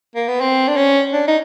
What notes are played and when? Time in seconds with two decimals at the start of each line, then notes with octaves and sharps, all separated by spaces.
0.16 A#3
0.28 B3
0.41 C4
0.68 D4
0.77 C#4
1.13 D4
1.28 D#4